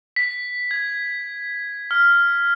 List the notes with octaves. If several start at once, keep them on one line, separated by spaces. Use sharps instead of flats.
B6
G#6
F6